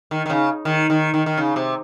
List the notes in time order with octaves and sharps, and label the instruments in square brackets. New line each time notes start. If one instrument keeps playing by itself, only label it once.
[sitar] D#3
D#3
C#3
D#3
D#3
D#3
D#3
C#3
C3